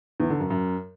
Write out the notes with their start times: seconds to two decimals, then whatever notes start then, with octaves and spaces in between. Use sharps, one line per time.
0.20 E2
0.30 D3
0.40 F#2
0.50 F#2